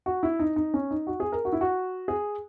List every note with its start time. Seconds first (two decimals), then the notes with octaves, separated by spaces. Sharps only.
0.06 F#4
0.23 E4
0.39 D#4
0.56 D#4
0.74 C#4
0.91 D#4
1.07 F#4
1.20 G#4
1.32 A#4
1.45 F#4
1.53 E4
1.61 F#4
2.08 G#4